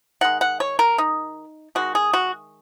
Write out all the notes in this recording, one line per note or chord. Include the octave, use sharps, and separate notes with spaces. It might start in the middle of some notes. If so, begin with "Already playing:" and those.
D#3 G#3 F#5
F#5
C#5
A#4
D#4
D#3 G#3 F#4
G#4
F#4